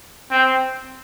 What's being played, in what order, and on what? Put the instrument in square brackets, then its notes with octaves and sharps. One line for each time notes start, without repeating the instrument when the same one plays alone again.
[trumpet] C4